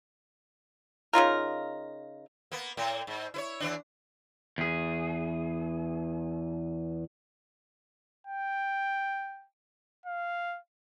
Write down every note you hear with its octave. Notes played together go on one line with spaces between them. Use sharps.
C#3 D#4 F4 A#4
A#3 B3
A2 A#3
G#2
E4 B4 C#5
E2 E3 D4
E2 G#4
G5
F5